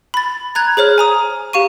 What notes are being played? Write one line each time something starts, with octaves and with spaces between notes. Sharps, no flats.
B5 A6
A#5 F#6 G#6 F7
G#4 C5 C#5 F6
G#5 A#5 D#6
G4 F5 C#6 D#7